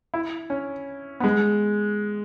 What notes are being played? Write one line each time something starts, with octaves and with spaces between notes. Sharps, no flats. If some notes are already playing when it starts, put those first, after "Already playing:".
E4
C#4
B3
G#3